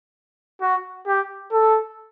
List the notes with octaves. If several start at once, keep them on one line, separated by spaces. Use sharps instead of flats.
F#4
G4
A4